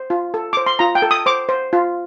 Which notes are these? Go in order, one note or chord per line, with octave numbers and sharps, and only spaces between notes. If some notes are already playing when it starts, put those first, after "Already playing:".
Already playing: C5
F4
A4
C5 D6
C6
F4 A#5
G5
A4
D#6
C5 D6
C5
F4